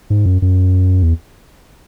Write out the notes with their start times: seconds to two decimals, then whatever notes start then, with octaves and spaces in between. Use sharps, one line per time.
0.10 G#2
0.26 F#2
0.42 F#2
1.03 E2